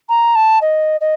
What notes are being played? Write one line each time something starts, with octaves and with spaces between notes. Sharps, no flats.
A#5
A5
D#5
D#5